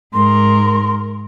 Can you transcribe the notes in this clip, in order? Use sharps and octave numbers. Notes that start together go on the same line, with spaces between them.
G#2 A#4 C6